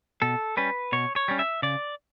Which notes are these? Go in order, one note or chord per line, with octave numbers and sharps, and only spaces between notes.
B2 A4
G3 C#4 B4
B2 C#5
C#5
G3 C#4
E5
C#3 D5